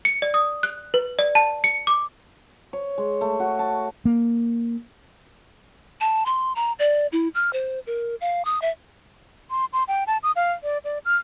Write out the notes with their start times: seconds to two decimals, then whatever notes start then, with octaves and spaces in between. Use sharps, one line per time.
0.05 C#7
0.22 D5
0.34 D#6
0.63 F#6
0.94 B4
1.19 D5
1.35 A5
1.64 C#7
1.87 D6
2.73 C#5
2.98 G#3
3.21 A3
3.40 F#4
3.59 A5
4.05 A#3
6.01 A5
6.26 C6
6.56 A#5
6.79 D5
7.12 E4
7.34 F6
7.53 C5
7.87 A#4
8.21 F5
8.45 D#6
8.62 E5
9.51 C6
9.73 C6
9.88 G5
10.07 A5
10.23 D#6
10.36 F5
10.63 D5
10.85 D5
11.05 F6